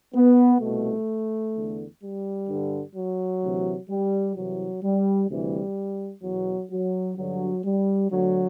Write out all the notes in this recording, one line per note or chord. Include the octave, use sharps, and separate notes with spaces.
B3
C2 B2 A3
E2 D3
G3
G2 D3
F#3
D2 C3 E3
G3
C2 C3 E3 F#3
G3
D2 C3 E3 G3
E2 B2 F#3
F#3
G2 D3 F#3
G3
D2 D3 F#3